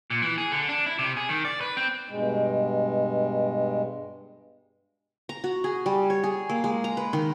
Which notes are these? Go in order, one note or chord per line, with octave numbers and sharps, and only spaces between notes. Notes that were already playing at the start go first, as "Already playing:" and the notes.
A#2
E3
G#4
D3
D4
E4
C3
G#4
D#3
D5
B4
C4
G2 B2 G#3
A#5
F#4
G#4
G3
C#5
G#4
A#3
G#3
A#5
B4
D#3